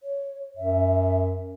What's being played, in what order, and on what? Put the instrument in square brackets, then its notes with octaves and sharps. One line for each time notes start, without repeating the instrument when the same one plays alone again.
[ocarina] C#5
[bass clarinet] F#2 [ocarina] E5